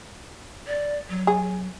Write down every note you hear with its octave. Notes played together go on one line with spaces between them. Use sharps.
D5
F#3
G#4